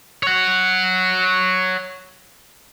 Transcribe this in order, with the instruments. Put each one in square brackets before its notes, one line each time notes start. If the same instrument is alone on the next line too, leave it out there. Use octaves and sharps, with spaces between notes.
[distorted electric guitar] C#5 F#5